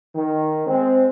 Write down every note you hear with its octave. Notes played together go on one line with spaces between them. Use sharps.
D#3
G#3 C4